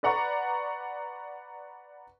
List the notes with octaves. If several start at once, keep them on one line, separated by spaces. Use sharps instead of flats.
B4 D5 F#5 A#5 C#6